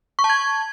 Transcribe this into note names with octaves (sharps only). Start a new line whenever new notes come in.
C#6
A5
G#6